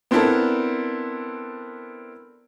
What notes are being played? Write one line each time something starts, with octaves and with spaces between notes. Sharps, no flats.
B3 C4 D4 E4 A4 A#4